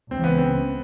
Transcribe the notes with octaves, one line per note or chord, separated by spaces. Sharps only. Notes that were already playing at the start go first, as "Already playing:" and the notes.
C#2 C#3 E3 C4
B3
C4